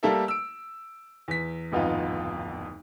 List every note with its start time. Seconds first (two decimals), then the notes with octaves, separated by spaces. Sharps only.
0.03 G3 A3 A#3 G4 A4 E5
0.28 E6 D7
1.28 E2 B6
1.72 D1 G#1 F2 B3 D#4 F4